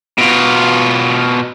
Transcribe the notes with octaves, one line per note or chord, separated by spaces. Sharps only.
B2 F4